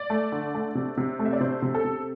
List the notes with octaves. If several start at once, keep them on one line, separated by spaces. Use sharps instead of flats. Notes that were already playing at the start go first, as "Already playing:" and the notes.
Already playing: D5
A3
D3
A3
C3
C3
A3
E5
D5
C3 C5
C3
A4
C3